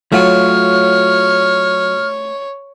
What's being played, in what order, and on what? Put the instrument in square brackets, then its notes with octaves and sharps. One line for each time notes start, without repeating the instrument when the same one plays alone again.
[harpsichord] F#3 [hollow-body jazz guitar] A3 F4 F#4 [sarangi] C#5 [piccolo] F6